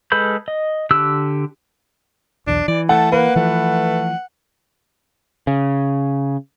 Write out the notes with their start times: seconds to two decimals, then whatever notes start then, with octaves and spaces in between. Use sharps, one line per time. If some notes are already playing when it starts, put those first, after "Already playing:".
0.12 G#3 A4 B4 B5 G6
0.48 D#5
0.91 D3 G4 E6 F#6
2.47 B1 E2 D4
2.68 E3 D5
2.89 A3 F#5 A5
3.12 A#3 B4 F#5
3.36 E3 F3 A3
5.47 C#3